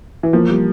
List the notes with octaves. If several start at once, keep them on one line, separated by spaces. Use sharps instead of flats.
E3
F3 A#3
G3